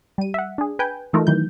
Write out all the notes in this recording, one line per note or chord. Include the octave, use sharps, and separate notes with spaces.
G3 D#7
E5 F#5
D4 G#4
B4 G5 G#5 G6
E3 A3 D#4 F4 A#4
D#3 E3 F#3 G6